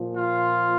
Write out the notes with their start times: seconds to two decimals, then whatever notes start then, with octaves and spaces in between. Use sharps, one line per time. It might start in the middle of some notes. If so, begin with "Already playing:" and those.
Already playing: A#2 F3
0.15 F4